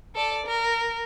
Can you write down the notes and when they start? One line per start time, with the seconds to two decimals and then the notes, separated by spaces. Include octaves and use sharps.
0.15 A4 D5
0.46 A#4